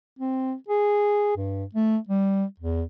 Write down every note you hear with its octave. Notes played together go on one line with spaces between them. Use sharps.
C4
G#4
G2
A3
G3
E2